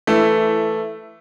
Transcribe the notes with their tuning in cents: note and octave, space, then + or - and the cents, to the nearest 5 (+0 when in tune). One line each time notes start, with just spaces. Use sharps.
E3 +0 A3 +0 E4 +15